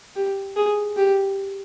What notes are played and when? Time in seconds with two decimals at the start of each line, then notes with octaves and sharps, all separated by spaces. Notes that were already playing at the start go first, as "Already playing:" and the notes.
0.16 G4
0.56 G#4
0.97 G4